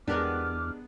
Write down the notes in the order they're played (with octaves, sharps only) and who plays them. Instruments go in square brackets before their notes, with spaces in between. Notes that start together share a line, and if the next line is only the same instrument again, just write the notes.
[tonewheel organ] E2 [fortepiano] G#3 D4 [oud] B3 G4 A#4 [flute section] D6 F6